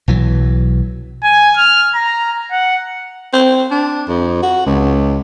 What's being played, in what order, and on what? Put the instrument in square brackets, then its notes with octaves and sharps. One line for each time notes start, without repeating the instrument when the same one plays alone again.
[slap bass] B1 E3 F#3
[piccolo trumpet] G#5
F6
A#5
F#5
[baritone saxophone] C4
D4
F2
F#4
C#2